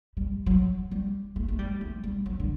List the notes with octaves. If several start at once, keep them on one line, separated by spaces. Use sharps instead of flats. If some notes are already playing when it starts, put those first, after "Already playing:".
G3
F#3
G3
A3
A3
G3
A3
G3
F#3
D3